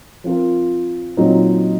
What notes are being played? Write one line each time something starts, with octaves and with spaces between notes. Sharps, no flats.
F3 C4 F4 A#4
A#2 F#3 C4 D#4